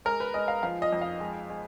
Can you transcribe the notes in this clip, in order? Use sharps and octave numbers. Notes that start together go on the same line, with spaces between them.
G#3 A#4
B4
G#3 D#5
F5
F3 F5
D#5
F2
F5
G#3
G#3